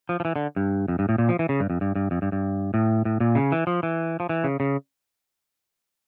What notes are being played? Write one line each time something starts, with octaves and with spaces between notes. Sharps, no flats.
F3
F3
E3
D3
G2
F2
G2
A2
A#2
F3
E3
C#3
G2
F2
G2
G2
F2
G2
G2
A2
A2
A#2
C#3
E3
F3
E3
F3
E3
C#3
C#3